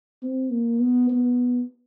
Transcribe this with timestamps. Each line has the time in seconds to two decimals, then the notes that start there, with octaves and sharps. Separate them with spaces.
0.23 C4
0.51 A#3
0.79 B3
1.10 B3